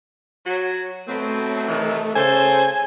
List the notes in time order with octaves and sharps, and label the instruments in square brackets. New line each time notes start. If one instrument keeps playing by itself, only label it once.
[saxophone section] F#3 F#4
[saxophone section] B2 F#3 C4 [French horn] A3
[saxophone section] C3 D#3 E3
[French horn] C#3 [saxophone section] A4 C5 [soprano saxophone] G#5